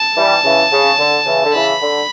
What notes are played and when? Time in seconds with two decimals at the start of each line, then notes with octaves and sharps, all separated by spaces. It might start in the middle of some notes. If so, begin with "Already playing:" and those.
Already playing: A5
0.17 E3 G3
0.44 C#3 E3
0.72 C#3
0.99 D3
1.26 C#3 E3
1.44 D3
1.54 C#3 E3 B5
1.82 D3